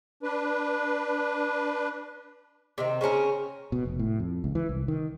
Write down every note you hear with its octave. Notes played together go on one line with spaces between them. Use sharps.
D4 B4
C3 D#3 C4
C#3 C4 C#4 A#4
B2
F1
A2
F2
C#2
E3
C2
D#3